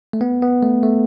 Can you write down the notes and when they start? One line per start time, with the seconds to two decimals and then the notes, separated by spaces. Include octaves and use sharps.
0.13 A3
0.21 B3
0.42 B3
0.63 A3
0.83 A3